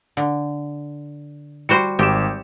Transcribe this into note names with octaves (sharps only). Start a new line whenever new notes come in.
D3
G3 F#4 C5 C#7
G#1 G4 E7